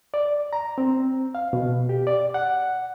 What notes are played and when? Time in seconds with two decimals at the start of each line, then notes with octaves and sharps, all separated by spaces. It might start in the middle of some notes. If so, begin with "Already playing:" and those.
0.14 D5
0.53 A#5
0.78 C4
1.35 F5
1.53 B2
1.89 G4
2.07 D5
2.34 F#5